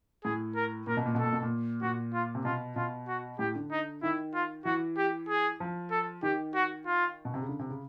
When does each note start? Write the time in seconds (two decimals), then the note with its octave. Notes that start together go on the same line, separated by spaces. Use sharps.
0.24 A2 G#4
0.56 A#4
0.87 A#2 A#4
0.97 B2
1.06 A#2
1.15 B2
1.19 A4
1.24 A#2
1.33 B2
1.43 A#2
1.82 A#2 F#4
2.14 F4
2.35 C3
2.45 B2 F4
2.76 B2 F4
3.08 F#4
3.39 A2 G4
3.55 D3
3.71 D#4
4.03 D#3 E4
4.34 F4
4.65 E3 F#4
4.98 G4
5.29 G#4
5.60 F3
5.91 A4
6.23 D#3 G4
6.55 F#4
6.86 F4
7.25 B2
7.34 C3
7.42 C#3
7.49 D3
7.59 C3
7.70 C#3